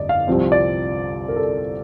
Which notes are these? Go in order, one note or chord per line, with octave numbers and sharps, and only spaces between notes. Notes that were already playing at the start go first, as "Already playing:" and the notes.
Already playing: G1 F2 D5 D#5
F5
C2 C3 F3 C4
D5
A#4
A4